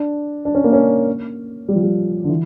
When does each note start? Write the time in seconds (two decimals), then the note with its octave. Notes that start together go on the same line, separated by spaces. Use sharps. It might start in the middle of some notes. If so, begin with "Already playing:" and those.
Already playing: D4
0.45 D4
0.55 C#4
0.64 A#3
0.73 C#4
1.69 G3
1.75 F3
1.82 G3
2.24 D3
2.29 E3